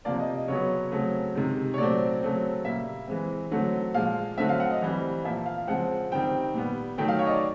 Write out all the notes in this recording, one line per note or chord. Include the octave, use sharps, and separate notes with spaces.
C3 F3 A#3 D5
D#5
D#5
C#3 F#3 B3 C#5
C#3 F#3 A3 C4
C3 D#3 G#3
C#5
A#2 F#3 A3 C4 D5
C#3 F#3 A3 C4
A#2 G3 A#3 E5
E3 G#3 C4
D3 F#3 A3 C4
A#2 F3 G#3 F5
D3 F#3 A3 C4 E5
F5
F#5
D#5
E3 G3 C4
A#2 F3 A#3 E5
F5
C#3 F3 G#3 C4 F#5
D#3 G3 C4 G5
A#2 G3 B3
D#3 F#3 A3 G5
F5
C#5
D#5
D5